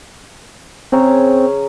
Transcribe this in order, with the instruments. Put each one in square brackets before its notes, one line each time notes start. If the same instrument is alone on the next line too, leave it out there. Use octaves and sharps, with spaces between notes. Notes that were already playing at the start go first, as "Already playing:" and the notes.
[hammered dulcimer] C#3 C#5 A#5 [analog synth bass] C4